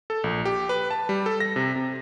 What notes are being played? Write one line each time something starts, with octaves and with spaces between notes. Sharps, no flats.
A4
A#1
G4
B4
A5
G3
A4
A#6
C3
C3